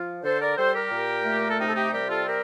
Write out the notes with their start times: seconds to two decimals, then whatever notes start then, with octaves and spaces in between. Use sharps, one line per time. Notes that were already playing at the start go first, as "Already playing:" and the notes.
Already playing: F3 F4
0.23 D3 A4 C5
0.41 A#4 D5
0.57 G3 A4 C5
0.74 G4 A#4
0.91 A#2
1.24 A3
1.50 A4
1.58 C3 D#4 G4
1.68 A4
1.75 D#4 G4
1.92 G3 G4 A#4
2.08 F4 A4
2.25 C4 G4 A#4